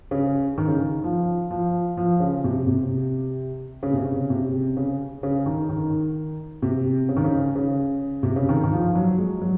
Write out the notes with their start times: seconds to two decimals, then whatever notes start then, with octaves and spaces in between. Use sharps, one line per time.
0.11 C#3
0.58 D#3
0.68 C#3
0.78 D#3
1.04 F3
1.51 F3
1.97 F3
2.20 C#3
2.44 C3
2.67 C3
3.83 C#3
3.93 C3
4.05 C#3
4.30 C3
4.77 C#3
5.23 C#3
5.46 D#3
5.69 D#3
6.62 C3
7.09 C#3
7.17 D#3
7.24 C#3
7.56 C#3
8.23 C3
8.36 C#3
8.49 D#3
8.64 D#3
8.72 F3
8.95 F#3
9.18 G#3
9.42 F#3